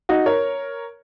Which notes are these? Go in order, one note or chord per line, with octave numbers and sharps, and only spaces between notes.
D#4 F#4
A#4 C#5